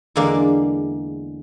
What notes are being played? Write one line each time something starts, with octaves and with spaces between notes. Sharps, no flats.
E2 D3 G#3 A#3 A#4 D5